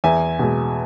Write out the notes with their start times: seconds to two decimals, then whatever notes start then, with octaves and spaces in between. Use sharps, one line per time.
0.04 E2 E5 G#5
0.39 B2 G#3